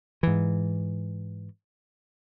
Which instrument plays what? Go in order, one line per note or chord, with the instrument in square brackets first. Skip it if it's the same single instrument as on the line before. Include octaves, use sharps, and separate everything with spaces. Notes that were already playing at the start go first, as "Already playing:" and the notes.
[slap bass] G#2 E3